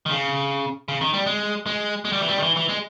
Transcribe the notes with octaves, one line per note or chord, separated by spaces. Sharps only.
D#3
C#3
C#3
D#3
G3
G#3
G#3
G#3
G3
E3
G3
D#3
E3
E3
G#3